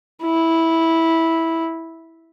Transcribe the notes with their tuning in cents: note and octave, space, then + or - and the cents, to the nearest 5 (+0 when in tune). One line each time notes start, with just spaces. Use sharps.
E4 -10